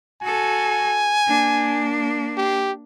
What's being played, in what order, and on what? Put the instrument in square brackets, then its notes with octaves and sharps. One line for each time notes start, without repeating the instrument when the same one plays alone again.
[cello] F#4 A4 [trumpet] G#5
[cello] A#3 D4
[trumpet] G4